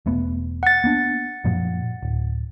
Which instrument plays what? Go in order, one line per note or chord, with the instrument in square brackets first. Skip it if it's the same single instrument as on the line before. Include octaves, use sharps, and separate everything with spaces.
[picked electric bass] E1 A3 B3
[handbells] F#5 A6
[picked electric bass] A#3 B3 D4
F#2 A#2 F3
D1